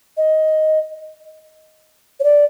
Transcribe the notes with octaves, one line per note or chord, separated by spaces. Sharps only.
D#5
C#5
D5